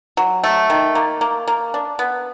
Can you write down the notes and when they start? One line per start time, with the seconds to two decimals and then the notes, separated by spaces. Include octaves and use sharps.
0.17 F#3
0.44 A3
0.70 D#3
0.95 A#3
1.21 A#3
1.48 A#3
1.74 D4
1.99 B3